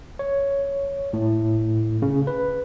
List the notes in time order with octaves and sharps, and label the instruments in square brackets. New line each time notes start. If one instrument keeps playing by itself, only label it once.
[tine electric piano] C#5
A2
C#3
B4